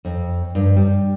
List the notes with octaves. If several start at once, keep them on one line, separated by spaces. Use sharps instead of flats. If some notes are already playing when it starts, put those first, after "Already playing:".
F2
G2
G3